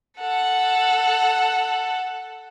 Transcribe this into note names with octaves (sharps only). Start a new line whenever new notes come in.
A4 F#5